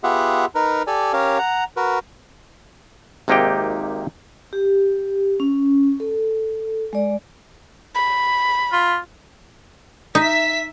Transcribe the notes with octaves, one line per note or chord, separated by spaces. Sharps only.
B3 F4 G4 G#4 E5 F#5
D#4 A#4 B4
G4 A4 D5 G#5
C#4 G4 A#4 C#5 F5
F#5 A#5
F#4 A#4 B4
G#1 C3 A#3 D#4 G4 G5
G4
C#4
A4
G#3 D5
B5
F4
D#4 E5 B6